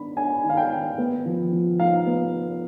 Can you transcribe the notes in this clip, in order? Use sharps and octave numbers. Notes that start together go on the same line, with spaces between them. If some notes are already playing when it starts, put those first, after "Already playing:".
Already playing: D#3 B3 D4 B5
D4 G#5
D#3
F5
G5
D#3
B3
F3
F3
D#4 F5
B3